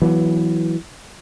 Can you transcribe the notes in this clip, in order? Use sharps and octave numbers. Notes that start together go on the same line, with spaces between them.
E3 F#3 B3